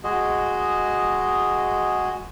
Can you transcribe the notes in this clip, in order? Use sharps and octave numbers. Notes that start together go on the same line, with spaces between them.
G#3 F#4 G#4 D#5